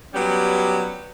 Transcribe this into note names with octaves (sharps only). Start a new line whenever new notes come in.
F#3 G3 B3 C#4 G4